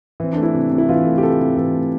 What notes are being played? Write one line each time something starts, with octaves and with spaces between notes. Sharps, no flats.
E3 C4
A3 D4
E4
C3
C3
E4
E3 F4
A3
G4
C3 A4
C3
E3 A4
A3